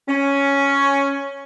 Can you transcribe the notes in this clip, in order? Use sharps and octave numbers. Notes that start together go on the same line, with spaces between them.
C#4